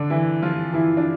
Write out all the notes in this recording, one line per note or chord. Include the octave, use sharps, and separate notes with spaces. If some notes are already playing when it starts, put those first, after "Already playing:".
Already playing: D3 D4
E3 E4
F3 F4
E3 E4
D4